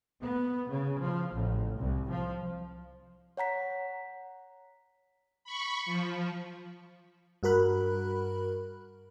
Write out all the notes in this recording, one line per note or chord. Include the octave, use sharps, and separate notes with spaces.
B3
C#3
F3
A1
C2
F3
C#5 F#5 A#5 B6
B5 C#6
F3
G2 F#4 A#4 B5 F#6